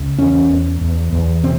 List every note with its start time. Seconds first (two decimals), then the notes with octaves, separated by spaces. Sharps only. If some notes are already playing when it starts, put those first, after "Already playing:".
Already playing: C#2
0.18 E2 C#4
0.50 E2
0.81 E2
1.12 E2
1.43 C3 C4